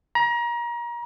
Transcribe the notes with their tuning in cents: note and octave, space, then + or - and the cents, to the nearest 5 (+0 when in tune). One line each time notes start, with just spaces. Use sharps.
A#5 +30